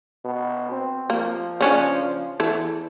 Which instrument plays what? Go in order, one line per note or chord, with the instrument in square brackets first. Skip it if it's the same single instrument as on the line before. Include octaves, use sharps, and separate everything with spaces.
[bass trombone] B2
C4
[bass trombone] F3 [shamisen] A#3
[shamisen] C#3 C#4 D4
[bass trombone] F3
[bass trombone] E2 [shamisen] E3 A4